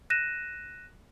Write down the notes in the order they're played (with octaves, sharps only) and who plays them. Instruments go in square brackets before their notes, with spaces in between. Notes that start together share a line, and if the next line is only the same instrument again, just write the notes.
[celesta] F#6 A#6 D#7 E7